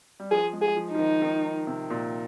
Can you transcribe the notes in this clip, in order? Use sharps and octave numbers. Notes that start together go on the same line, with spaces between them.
G3
F3 G#4
G#3
G#4
F3
F3 D#4
D#3
D#3
C3
A#2